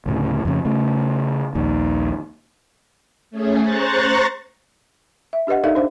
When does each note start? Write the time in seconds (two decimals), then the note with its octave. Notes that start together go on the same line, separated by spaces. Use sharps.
0.06 D2 A2 C#3
0.45 F2 C#3
0.65 C#3 A3
1.55 A#1 D#2 D#3
3.30 A3 C#4 G#4
3.61 C5 A#5 C#6 F#6 A6
5.33 E5
5.47 D4 G4 B4 D#5 F#5
5.64 D#4 A4 A#4 D5 E5 F5
5.75 D4 C5 F5